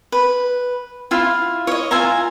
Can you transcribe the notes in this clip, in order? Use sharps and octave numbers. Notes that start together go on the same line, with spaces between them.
B4
E4 F4
C#5 D#5
F4 E5 G#5 A#5